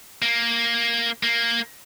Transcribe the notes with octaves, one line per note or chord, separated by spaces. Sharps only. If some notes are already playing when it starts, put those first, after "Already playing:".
A#3
A#3